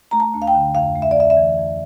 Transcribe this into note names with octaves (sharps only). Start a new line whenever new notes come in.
A3 A#5
A5
D2
F5
G5
D3
F2 F5
A3
E5
D5
F2 E5
E5
E3
F2